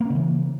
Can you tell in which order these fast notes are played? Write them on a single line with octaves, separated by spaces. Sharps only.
A#3 C#4 C#3 E3